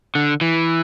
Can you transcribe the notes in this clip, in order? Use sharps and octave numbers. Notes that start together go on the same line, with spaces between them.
D3
E3